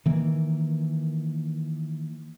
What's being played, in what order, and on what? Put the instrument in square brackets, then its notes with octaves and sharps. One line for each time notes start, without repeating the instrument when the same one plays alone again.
[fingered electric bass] D#3 E3 A#3